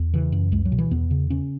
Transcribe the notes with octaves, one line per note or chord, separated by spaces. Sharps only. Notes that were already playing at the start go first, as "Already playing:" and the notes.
Already playing: E2
C#3 E3
F#2
C#2 G#3
F#3
B2
E3
E2 B3
C#3
C#3 C#4